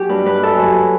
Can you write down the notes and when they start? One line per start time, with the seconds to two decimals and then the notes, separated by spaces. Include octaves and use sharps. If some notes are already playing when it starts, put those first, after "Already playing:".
Already playing: F#3 G4
0.09 G2 B4
0.25 G2 B4
0.42 F#2 A4
0.59 F#3